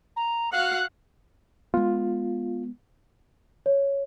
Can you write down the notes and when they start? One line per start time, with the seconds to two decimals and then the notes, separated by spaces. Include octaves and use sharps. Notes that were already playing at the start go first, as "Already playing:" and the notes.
0.16 A#5
0.52 F#4 F5 F#5 F#6
1.74 G#3 B3 F4
3.66 C#5